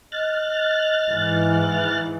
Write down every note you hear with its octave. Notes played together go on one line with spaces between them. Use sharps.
D#5 F6 F#6 A6
G#2 E3